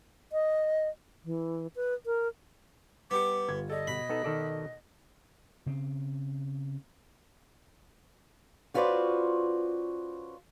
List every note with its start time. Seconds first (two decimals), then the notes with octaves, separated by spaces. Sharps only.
0.32 D#5
1.25 E3
1.76 B4
2.06 A#4
3.11 G3 B3 G4 D6 C#7
3.49 G1 F4 G#6
3.70 A4 D5 D#5
3.87 B2 B5
4.09 B3 D#4 A4
4.24 D#3 A4 D5
5.66 C#3 C4
8.74 C#4 F4 F#4 B4 C5 D5